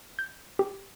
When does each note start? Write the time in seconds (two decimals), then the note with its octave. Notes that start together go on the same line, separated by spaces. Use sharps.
0.19 G6
0.59 G4